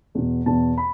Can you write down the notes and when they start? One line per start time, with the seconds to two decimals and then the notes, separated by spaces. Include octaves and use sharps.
0.15 E2 B2
0.46 E2 B2 A5
0.78 B5